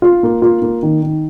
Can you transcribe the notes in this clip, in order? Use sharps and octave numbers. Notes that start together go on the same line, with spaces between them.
F4
A#3
F4
A#3
D#3
D#3